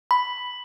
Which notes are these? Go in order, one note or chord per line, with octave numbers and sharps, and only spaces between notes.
B5